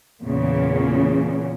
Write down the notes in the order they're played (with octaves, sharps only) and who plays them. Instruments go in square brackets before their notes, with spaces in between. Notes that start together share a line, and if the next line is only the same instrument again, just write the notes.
[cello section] E2 A#2 C#3